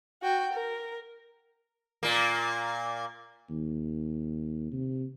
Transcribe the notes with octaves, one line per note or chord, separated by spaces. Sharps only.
F#4 G5
A#4
A#2 A#3
D#2
C3